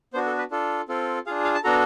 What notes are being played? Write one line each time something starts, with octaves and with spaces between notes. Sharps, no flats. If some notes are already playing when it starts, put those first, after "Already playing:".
B3 D4 F#4 C5
A4
B4
D4 F4 A4
C4 F4 A4
D4 F4 G#4 F5
F5
A5
B3 D4 F#4 A4 A#5